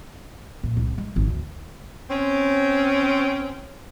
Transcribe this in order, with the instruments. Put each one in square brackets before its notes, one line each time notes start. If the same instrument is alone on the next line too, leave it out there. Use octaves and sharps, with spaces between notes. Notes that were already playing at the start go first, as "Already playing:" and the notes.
[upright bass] A#2
C2
G#3
G#1
D2
[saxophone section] C4 C#4